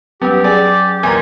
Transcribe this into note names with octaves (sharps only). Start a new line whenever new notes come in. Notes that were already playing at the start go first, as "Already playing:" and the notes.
F#3 G3 B3 C#4 G4
G#4 D5
A1 D#2 A#4 G#5